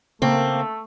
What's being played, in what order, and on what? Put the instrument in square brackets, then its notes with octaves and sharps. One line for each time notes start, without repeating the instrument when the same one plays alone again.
[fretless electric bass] C#3 [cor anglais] A3 [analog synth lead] A#3 [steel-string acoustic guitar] C4